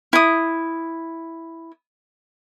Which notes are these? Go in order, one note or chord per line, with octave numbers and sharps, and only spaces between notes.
E4 D#6